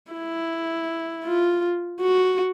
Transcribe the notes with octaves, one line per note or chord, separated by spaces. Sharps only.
E4
F4
F#4